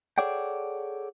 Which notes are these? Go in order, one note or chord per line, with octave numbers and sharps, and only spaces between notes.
G#4 A4 C#5 D5 F#5 G5